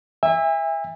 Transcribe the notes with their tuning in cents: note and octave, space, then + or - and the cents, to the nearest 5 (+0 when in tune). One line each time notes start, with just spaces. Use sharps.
E5 +0 G#5 -40